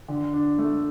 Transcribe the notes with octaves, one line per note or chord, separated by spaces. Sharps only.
D3
D4
A3